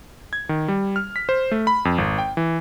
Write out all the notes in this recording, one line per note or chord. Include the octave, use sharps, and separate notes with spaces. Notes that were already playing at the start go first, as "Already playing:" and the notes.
G#6
D#3
G3
F6
B6
C5
A3
B5
F2
G#1
G5
E3